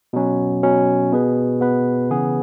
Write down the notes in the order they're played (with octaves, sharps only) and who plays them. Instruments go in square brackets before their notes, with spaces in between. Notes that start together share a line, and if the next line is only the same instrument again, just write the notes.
[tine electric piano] B2 F#3 C#4
B2 F#3 C#4
B2 B3 G#4 B4
B2 B3 G#4 B4
C#3 E3 B3 G#4